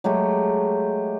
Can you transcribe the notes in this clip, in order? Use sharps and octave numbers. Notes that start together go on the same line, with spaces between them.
F#3 G#3 A3 G4